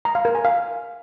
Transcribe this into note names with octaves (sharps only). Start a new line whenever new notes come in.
A#5
F5
A#4
G#5
F5